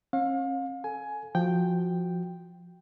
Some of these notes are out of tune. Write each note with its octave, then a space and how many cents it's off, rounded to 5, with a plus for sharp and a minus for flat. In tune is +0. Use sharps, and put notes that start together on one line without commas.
C#4 -45 F5 +35
A4 +0 G#5 +15
F3 +0 F#4 +0 G5 +0